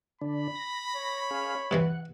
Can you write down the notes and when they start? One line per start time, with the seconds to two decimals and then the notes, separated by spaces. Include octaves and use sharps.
0.21 D3 D4 B5
0.55 A#6
0.95 C#5
1.31 C#4 G#4 F5
1.71 G2 C3 E3 F#5